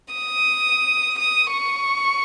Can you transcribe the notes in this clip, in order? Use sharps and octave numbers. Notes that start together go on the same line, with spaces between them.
D#6
D#6
C#6